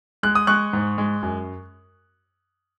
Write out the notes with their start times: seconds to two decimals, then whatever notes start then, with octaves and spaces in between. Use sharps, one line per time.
0.23 G#3 F#6
0.35 D#6
0.47 G#3 C#6 F#6
0.73 G#2
0.98 G#3
1.23 F#2